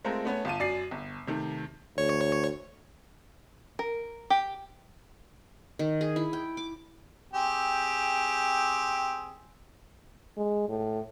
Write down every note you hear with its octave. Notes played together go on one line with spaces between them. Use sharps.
G#3 A3 C4 F4 A#4
A3 B3 C#4
G1 F4 A5 D#7
F#2 D5 C7
G1
C3 D#3 A3
D2 C#5
A#4
G4
D#3
G#4
E4
G5
D6
C4 G4 G#4
G#3
A2